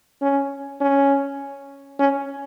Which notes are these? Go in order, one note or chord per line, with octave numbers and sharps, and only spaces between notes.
C#4
C#4
C#4